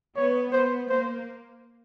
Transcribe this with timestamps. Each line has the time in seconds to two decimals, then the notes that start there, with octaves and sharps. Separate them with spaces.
0.16 B3 C#5
0.52 B3 C5
0.89 A#3 C5